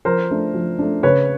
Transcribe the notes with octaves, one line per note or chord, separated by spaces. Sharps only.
F3 A#4 C5
A3 D4
F3
A3 D4
C#3 B4 C#5